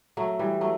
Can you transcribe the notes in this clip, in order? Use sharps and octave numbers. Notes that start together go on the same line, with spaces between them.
F#3 A3
E3 G3
F#3 A3